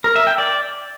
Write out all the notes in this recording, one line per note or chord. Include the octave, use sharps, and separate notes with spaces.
A#4
E5
G5
D5